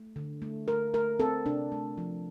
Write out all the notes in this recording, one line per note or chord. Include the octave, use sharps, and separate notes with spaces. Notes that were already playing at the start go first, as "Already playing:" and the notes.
Already playing: A3
D3
A3
A3 A#4
A3 A#4
C4 A4
C3 D4
A3
F3